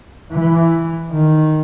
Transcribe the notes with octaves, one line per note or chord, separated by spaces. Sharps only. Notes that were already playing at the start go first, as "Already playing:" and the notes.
E3
D#3